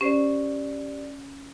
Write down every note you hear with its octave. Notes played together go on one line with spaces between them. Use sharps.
C#4 G4 C5 D5